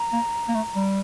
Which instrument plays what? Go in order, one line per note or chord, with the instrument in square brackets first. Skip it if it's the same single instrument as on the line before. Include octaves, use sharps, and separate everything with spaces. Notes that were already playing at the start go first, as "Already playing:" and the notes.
Already playing: [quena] A#5
[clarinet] A#3
A#3
A3
G3